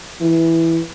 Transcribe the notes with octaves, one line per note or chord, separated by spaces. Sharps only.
E3